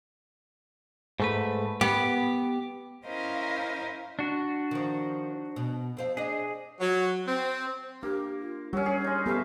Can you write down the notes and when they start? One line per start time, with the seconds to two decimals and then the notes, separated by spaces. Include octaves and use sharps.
1.20 G#2 A3 B4
1.81 B3 G4
3.06 C#4 E4 A#4 C5 D#5 F5
4.19 D4 F#4
4.71 D#3 F3
5.56 B2
5.97 F2 C4 F5
6.17 D4 G#4 D#5
6.80 F#3
7.28 C4
8.03 A#3 D4 G4
8.40 F4
8.73 F#3 G3 C#4 G4 C#5
8.86 G#4
9.04 G#3 D#4
9.26 C#3 B3 G4 A4 B4 E5 F5